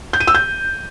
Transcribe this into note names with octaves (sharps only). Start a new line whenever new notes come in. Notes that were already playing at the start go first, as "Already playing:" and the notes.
G6
D#7
E6
G6